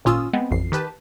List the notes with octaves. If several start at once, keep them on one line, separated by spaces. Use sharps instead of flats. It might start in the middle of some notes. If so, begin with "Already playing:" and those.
G#1 A#2 C#4 F4 D#6 E6
G#3 B3 C4
A1 F2 C7
D#3 G4 B4 A5